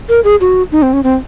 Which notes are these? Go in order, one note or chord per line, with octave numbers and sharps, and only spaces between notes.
A#4
G#4
F#4
D#4
C4
C#4
C4